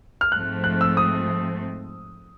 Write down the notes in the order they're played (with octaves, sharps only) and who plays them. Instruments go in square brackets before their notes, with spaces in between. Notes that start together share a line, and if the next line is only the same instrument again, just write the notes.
[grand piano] F6
[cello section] G#2 F3 A3 C4 [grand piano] F#6
[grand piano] F#6
E6
D#6